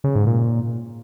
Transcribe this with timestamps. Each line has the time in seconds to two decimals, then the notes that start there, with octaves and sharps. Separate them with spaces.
0.04 C#3
0.15 G#2
0.27 A#2